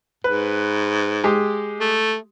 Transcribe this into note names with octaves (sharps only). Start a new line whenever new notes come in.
G#2 B4
G#3 G4
A3